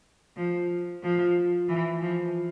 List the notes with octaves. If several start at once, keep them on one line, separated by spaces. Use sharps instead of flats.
F3
F3
E3
F3